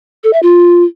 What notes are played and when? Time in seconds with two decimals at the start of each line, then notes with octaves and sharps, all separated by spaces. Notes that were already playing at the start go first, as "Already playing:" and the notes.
0.24 A4
0.33 E5
0.43 F4